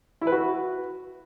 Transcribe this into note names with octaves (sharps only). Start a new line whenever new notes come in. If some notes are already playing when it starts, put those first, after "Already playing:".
E4
B4
F#4